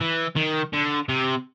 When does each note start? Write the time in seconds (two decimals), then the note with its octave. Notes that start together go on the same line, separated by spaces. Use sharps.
0.01 E3
0.36 D#3
0.73 D3
1.09 C3